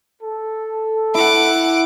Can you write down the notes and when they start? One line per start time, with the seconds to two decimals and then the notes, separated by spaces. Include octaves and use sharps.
0.22 A4
1.15 E4 F#5 D6